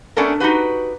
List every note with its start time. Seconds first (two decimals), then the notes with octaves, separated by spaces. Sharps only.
0.17 A3 B3 C#4 D4 A4 A#4
0.40 D#4 F#4 G4 B4